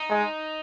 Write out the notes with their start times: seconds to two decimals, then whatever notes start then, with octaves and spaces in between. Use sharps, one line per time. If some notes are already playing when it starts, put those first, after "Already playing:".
Already playing: D#4
0.10 G#3